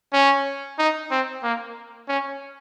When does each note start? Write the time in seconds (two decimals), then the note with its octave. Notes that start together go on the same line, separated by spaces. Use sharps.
0.13 C#4
0.79 D#4
1.11 C4
1.43 A#3
2.08 C#4